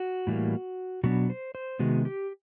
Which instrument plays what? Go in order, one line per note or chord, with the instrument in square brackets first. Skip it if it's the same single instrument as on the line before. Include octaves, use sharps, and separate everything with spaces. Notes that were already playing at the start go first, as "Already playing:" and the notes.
Already playing: [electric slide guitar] F#4
A2 E3 G3 A#3
B2 F#3 B3 D4 F#4
C5
C5
C3 D#3 G#3 B3 F#4
G4